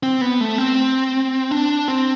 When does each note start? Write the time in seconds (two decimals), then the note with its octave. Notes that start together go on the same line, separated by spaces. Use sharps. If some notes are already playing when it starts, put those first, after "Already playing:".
0.03 C4
0.21 B3
0.41 A3
0.58 C4
1.51 D4
1.88 C4